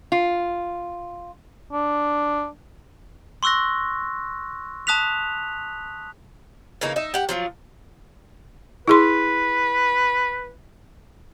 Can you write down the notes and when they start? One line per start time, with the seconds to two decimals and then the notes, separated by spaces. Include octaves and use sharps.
0.12 F4
1.73 D4
3.43 C6 C#6 E6 F#6 A#6
4.87 A5 D#6 F#6 B6 F7
6.81 C#3 E3 A#3 D#4
6.96 D#4 D#5 E5
7.14 G4 F#5
7.29 F3 F#3 F4
8.88 E4 G#4 B4 C6